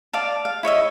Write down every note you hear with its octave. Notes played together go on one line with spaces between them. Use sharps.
D5 F5 A5
F5
E4 C#5 D#5 E5